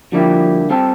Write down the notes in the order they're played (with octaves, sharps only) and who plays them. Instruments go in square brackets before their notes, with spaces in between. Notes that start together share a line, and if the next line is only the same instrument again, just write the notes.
[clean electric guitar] D3 G3 A#3 E4 G4 [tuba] F3
[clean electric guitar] G3 C4 F4 A4